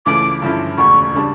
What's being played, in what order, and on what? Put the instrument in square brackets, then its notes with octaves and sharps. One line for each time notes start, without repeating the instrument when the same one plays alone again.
[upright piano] C#2 C#3 E3 A3 [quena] D6
[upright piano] G2 D3 F3 C#4 E4
[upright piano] E1 D2 C#3 [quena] C#6
[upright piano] C#3 G3 D4